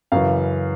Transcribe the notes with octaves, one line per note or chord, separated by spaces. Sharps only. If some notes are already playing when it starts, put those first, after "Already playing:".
F#2 C#3 E3 F5